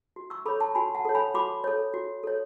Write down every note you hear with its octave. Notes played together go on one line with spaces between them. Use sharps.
F#4
C#6 E6
A4 C#5 B5 D6
A5 C#6
F#4 G#5 B5
F#5 A5
A4 C#5
G#5 B5
F#4 B5 D6
A4 C#5
F#4
A4 C#5